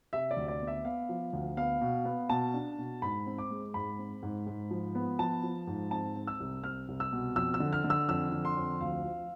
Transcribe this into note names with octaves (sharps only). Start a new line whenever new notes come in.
C3 E5
D5
D2
D5
B3
E5
B3 F5
F3
D2
B3 F5
B2
B3
B2 A5
D4
B2
G#2 B5
C4
D6
G#3
G#2 B5
C4
G#2
G#2
F3
B3
F3 A5
F3
G#2
C4 A5
C4
E6
C2
C4 F6
C2
E6
B2
F2 E6
E6
D3
F6
D3
E6
F2 E6
D3
C6
F2
D2 F5
F3